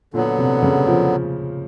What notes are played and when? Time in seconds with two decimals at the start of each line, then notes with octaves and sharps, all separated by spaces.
0.13 A#2 D3
0.16 F#3 B3
0.38 C3
0.62 C#3
0.87 F3